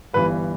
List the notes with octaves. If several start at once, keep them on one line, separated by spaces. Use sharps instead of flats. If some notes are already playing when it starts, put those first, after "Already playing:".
G1 G2 E3 B4